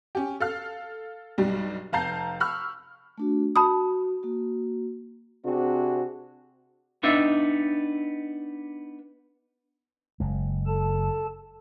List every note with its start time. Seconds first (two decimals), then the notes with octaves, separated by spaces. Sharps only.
0.15 C#4 G4
0.40 A4 F5 F6
1.38 B1 G2 G3
1.93 F1 F5 A5 A#5 G6 C7
2.40 B5 C#6 E6 F6
3.18 A3 D4 F#4
3.56 F#4 A5 B5 D#6
4.23 A#3 F#4
5.44 C3 C4 D4 F#4 G#4 C5
7.03 B3 D4 D#4 E5
10.20 F#1 G#3
10.67 A4 A5